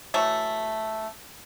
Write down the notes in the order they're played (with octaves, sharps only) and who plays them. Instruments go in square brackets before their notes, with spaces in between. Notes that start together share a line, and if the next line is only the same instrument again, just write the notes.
[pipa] E3 F#3 A3